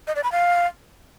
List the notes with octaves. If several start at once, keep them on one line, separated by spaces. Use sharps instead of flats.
D#5
D5
B5
F5